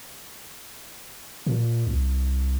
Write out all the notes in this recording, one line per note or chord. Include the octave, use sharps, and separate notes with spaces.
A#2
C2